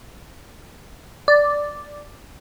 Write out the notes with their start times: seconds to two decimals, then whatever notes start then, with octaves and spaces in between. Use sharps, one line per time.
1.28 D5